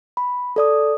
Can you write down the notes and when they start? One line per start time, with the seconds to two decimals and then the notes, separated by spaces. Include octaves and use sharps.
0.17 B5
0.56 A4 D5 D#6